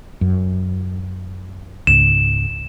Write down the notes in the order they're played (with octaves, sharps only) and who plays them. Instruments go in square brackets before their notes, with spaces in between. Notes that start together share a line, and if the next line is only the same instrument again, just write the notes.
[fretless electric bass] F#2
[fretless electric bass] C#2 G#2 [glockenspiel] E7